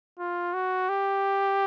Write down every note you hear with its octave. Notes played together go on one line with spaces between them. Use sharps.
F4
F#4
G4